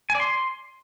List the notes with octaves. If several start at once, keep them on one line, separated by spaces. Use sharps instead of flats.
G#5
D5
C6